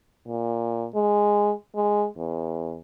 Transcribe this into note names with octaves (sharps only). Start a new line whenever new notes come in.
A#2
G#3
G#3
E2